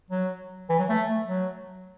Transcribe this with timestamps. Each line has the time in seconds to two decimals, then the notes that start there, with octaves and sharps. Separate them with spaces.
0.10 F#3
0.69 E3
0.79 F#3
0.89 A3
1.28 F#3